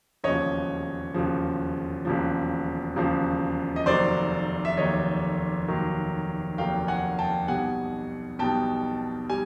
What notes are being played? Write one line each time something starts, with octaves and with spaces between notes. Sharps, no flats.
E1 D#2 C#3 F3 C#5 D#5
E1 D#2 C#3 F3
E1 D#2 C#3 F3
E1 D#2 C#3 F3
D#5
F1 D#2 D#3 F#3 C5 D5
E5
F1 D#2 D#3 F#3 C#5 D#5
F1 D#2 D#3 F#3
F1 D#2 D#3 F#3 F5 G5
F#5 G#5
G5 A5
B1 B2 G3 F#5 G#5
B1 B2 G3 G5 A5
G3 G#5